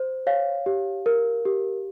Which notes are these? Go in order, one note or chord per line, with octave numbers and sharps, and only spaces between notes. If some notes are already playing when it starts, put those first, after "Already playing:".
Already playing: C5
C#5 F5
G4
A#4
G4